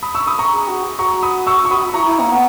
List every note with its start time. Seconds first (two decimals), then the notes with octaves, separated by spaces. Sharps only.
0.03 B5 D#6
0.15 C#6 E6
0.27 B5 D#6
0.39 A#5 C#6
0.51 G#4
0.67 F#4
0.83 G#4
0.99 F#4 A#5 C#6
1.23 B5 D#6
1.47 C#6 E6
1.65 C#6
1.71 B5 D#6
1.94 E4 A#5 C#6
2.06 E4
2.19 A#3
2.30 B3